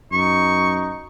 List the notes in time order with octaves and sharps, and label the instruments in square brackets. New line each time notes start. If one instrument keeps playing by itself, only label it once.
[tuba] F#2 [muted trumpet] D#4 [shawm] C#6